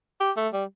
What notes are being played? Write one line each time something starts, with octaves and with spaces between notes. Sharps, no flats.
G4
A3
G3